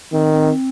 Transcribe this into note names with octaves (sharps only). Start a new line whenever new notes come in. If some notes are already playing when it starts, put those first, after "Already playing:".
D#3 C4
C4